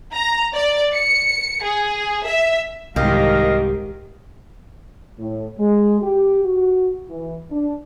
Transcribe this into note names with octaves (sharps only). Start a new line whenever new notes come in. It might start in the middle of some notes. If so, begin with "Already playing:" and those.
A#5
D5
C#7
G#4
E5
C2 G#2 D#3 G4 A#4 D#5 F5
A2
G#3
G4
F#4
E3
D4